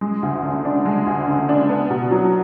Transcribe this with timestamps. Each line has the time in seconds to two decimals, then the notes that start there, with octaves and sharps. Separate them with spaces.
0.01 G#3
0.23 D2
0.43 D3
0.65 D4
0.85 G#3
1.07 D2
1.28 D3
1.49 D4
1.69 B3
1.90 B2
2.11 F#3